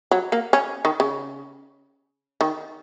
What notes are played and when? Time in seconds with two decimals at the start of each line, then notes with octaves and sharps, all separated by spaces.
0.11 F#3
0.32 A#3
0.53 C#4
0.85 D#3
1.00 C#3
2.41 D#3